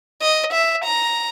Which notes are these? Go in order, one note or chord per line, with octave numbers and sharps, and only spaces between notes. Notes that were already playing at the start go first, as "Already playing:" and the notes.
D#5
E5
A#5